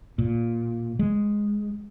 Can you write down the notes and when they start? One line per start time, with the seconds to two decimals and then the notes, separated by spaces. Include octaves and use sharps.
0.18 A#2
0.99 G#3